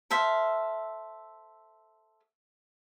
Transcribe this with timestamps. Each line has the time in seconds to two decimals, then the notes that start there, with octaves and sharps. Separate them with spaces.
0.11 A4 C5 E5 F5